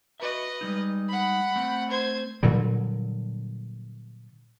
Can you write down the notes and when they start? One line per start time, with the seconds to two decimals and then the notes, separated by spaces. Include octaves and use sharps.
0.20 F#4 B4 D#5 E5
0.61 G3 G#3 D#4
1.09 F#5 B5
1.56 A3 C4
1.90 C5 G#6
2.43 A#2 D3 F#3 G3